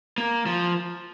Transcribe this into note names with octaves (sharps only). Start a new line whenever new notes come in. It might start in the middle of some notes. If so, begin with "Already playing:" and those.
A#3
F3